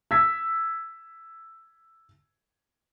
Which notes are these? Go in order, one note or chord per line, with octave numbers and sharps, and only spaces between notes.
E6 G#6 B6